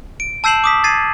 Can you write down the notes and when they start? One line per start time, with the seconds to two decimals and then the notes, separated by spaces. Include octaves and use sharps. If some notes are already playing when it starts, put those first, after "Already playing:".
0.20 D7
0.44 A5 E6 G6 C7 E7 F#7
0.64 D6 D#6 B6
0.84 G#6 A6 C7 D#7